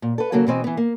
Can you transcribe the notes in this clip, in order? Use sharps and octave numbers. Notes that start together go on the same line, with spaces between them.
A#2
A4 B4
C#3 F#3 A#3 F#4 A4
B2 E3 C4 D#5
E3 B3
A#3